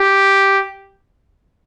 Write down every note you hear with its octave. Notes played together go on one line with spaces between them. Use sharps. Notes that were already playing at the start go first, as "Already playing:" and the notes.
Already playing: G4